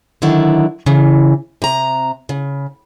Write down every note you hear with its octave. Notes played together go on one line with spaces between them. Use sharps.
D3 D#3 F#3 E4
C#3 E3
C3 A#5
C#3